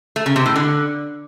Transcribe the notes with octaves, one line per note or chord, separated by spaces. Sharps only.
A3
C#3
C3
A2
D3